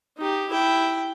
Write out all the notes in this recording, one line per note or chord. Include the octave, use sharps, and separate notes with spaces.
D#4 G4
E4 G5